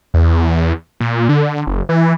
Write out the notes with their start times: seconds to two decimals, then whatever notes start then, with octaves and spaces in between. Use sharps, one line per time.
0.14 E2
1.00 A#2
1.29 D3
1.67 F#1
1.89 E3